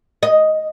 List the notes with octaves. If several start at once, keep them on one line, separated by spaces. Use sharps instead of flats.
D#5